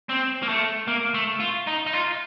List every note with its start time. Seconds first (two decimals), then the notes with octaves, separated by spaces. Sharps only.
0.10 C4
0.43 A#3
0.49 A3
0.88 A#3
1.14 A3
1.40 F4
1.67 D#4
1.86 D#4
1.93 F4